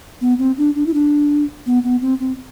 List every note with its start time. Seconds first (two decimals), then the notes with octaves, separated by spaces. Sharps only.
0.21 B3
0.39 C4
0.58 D4
0.75 D4
0.86 E4
0.94 D4
1.66 B3
1.84 B3
2.02 C4
2.19 C4